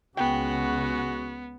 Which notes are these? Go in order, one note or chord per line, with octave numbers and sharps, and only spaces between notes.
C#2 C#3 G#3 B3 F#4 G5